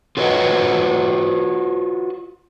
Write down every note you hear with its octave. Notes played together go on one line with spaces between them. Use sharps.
F4 F#4 B4 C#5 D#5 F#5